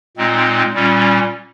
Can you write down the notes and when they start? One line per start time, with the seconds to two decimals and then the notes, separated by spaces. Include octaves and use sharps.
0.17 A#2 G#3 C4 D#4
0.73 A#2 G3 C#4